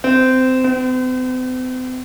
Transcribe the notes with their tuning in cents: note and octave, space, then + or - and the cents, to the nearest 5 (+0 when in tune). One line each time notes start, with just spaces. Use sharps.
C4 -20
C4 -45